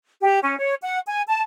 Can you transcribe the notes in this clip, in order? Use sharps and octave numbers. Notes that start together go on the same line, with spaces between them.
G4
C#4
C#5
F#5
G#5
A5